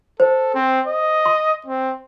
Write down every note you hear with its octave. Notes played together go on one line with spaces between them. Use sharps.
A4 C5
C4
D#5
C6
C4